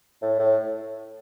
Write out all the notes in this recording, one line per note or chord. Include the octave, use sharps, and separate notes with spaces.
A2
A2